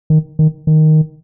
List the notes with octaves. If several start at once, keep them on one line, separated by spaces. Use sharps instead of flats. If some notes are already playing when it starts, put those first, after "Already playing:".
D#3
D#3
D#3